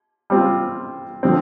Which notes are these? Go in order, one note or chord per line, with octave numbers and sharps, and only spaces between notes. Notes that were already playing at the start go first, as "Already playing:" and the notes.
G3 C4 F4
D3 F3 C4